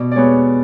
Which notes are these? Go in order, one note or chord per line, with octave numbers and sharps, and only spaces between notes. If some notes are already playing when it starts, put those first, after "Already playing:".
Already playing: B2 D5
D5
G#3 B3 C#5